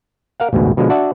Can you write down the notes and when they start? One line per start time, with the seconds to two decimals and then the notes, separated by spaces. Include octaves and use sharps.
0.40 A#4 F5 F#5
0.53 A1 D2 G#2 B2
0.77 B2 D3 F3 G#3
0.89 D4 F#4 D5 E5 F#5 A5